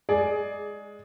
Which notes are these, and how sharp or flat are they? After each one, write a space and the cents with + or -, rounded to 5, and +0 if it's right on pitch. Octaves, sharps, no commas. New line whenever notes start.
G#3 +0 G#4 +15 D5 +0